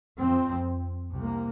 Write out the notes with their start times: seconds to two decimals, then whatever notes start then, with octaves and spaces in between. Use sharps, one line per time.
0.20 F2 F3 C4
1.16 C2 C3 A#3